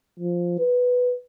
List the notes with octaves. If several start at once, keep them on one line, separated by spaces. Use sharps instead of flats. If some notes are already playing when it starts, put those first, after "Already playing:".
F3
B4